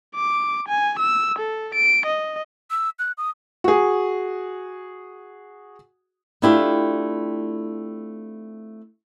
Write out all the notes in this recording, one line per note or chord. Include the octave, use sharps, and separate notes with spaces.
D6
G#5
E6
A4
D7
D#5
E6
F#6
D#6
F#4 G#4
A3 C4 D4 E4 F4 G4